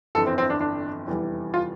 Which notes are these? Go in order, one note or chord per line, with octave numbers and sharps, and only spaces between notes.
G1 F2 E3 A4
C4
C4
D4
D4
F1 E2 E3 G3
F4